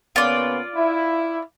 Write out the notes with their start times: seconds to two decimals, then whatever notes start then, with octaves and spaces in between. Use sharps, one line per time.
0.16 C#3 A#3 B3 F4 D5
0.75 E4